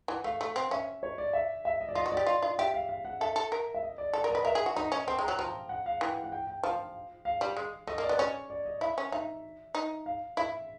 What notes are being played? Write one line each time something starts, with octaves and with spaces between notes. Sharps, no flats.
E3 F#5
A3 F5
A3
C4
C#4 E5
C#5
D5
E5
E5
D#5
D5
F4 D#5
F#4
D5
G4
F4 D#5
F4
G4 E5
F5
F5
F#5
A4 E5
A4
A#4
E5
D#5
D5
A4 D5
A#4
B4 D#5
A#4 E5
G#4
F#4
D#4 D#5
C#4
C4 G5
G#3
A#5
F#3
F3 A#5
F#5
F5
E3 G5
F#5
G5
G5
F3 F5
F5
G3
G#3
A3 D#5
A#3
D5
B3
C#4 C#5
D5
D#5
E4 E5
C#4
D#4 E5
D#4
F5
E4 E5